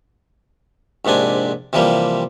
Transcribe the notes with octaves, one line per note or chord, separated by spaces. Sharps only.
A#1 G#2 C3 D4 G#5
C3 E3 F3 G3 A#3